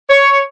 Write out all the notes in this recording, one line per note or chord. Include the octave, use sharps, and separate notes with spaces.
C#5